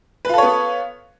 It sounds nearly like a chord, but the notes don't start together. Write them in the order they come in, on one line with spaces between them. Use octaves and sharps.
B4 F4 A4 C#5 B3